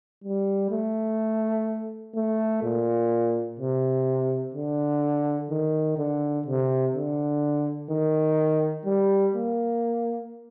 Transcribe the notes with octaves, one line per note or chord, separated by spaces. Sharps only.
G3
A3
A3
A#2
C3
D3
D#3
D3
C3
D3
D#3
G3
A#3